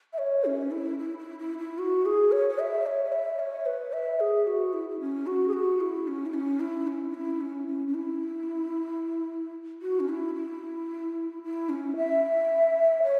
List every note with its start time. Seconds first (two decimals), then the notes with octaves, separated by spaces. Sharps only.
0.13 E5
0.18 C#5
0.45 C#4
0.71 E4
0.98 E4
1.18 E4
1.39 E4
1.58 E4
1.78 F#4
2.05 G#4
2.32 C#5
2.49 C#5
2.59 E5
2.86 C#5
3.04 C#5
3.12 E5
3.39 C#5
3.66 B4
3.92 E5
4.20 G#4
4.47 F#4
4.73 E4
4.89 E4
5.00 C#4
5.27 F#4
5.48 G#4
5.53 F#4
5.80 E4
6.07 C#4
6.26 E4
6.34 C#4
6.60 E4
6.87 C#4
7.10 C#4
7.14 E4
7.41 C#4
7.67 C#4
7.87 C#4
7.94 E4
9.82 F#4
10.00 C#4
10.09 E4
10.35 E4
11.43 E4
11.69 C#4
11.96 E5
13.03 C#5